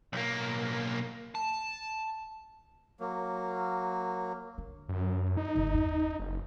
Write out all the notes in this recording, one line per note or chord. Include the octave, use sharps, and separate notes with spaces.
B1 A#3
A5
F#3 A#3
D3
F#2
D#4
G1 D3
E2 C#4
F#1